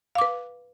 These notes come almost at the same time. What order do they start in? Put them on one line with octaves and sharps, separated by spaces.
F5 D6 B4